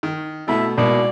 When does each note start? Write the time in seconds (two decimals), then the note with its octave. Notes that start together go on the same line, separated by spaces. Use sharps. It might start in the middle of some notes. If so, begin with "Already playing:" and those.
0.03 D#3
0.48 B2 A3 E4
0.78 G#2 B2 A#3 E4 D5